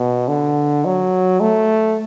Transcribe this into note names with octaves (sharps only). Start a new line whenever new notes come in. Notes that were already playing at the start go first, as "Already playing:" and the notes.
Already playing: B2
D3
F#3
A3